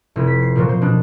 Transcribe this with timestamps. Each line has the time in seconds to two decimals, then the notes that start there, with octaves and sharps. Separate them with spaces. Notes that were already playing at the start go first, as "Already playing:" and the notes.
0.16 F1 E4
0.27 B6
0.42 C7
0.56 A#2 F3 F#3
0.69 C5
0.81 B2 D4